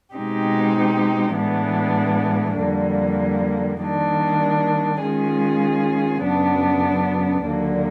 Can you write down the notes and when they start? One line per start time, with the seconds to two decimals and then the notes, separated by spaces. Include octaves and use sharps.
0.15 B2 G#3 C4 D#4 G4
1.36 A2 E3 G#3 B3 D4
2.58 F2 D3 G3 A#3
3.79 D#3 G3 A#3 D4
5.02 D#3 G#3 C#4 F4 G#4
6.23 F#2 C#3 F#3 B3 D4
7.45 D#2 D3 F#3 A#3